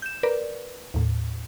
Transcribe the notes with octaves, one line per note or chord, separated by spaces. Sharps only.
G6 E7
A#4 B4 D5
D#2 A2